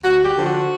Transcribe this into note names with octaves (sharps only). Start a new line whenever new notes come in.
D2 F#4
G4
D3 F3
F#4